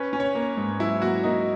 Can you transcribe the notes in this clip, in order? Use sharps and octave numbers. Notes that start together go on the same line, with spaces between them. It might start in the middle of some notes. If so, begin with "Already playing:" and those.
Already playing: C#4 B4
C#4
C#5
A#3
G#2
F#3 E4
A#3 F#4
A#3 D#4